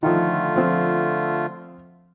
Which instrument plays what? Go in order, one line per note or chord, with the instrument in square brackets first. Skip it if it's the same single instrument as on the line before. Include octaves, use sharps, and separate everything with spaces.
[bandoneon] D3 A3 F4 [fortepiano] D#3 F3
[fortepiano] F3 C4